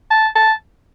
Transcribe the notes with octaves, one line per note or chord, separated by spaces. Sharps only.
A5
A5